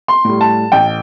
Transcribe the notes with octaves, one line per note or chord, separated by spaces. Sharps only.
C6
A2 G3
A5
A1 G5